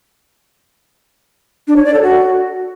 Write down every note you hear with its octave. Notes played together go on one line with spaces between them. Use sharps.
D4
C#5
D5
A4
F#4